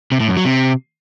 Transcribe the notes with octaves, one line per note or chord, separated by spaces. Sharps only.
C3
A2
F#2
F#3
C3